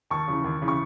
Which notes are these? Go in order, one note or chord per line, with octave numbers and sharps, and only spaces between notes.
D#2 A5 C#6
C#3 E3
D#2
C#3 E3
C#6